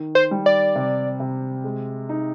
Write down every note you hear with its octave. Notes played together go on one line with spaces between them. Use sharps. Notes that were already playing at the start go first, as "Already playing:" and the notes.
Already playing: D#3
C5
G3
D5
C3
C3
G#3
D#4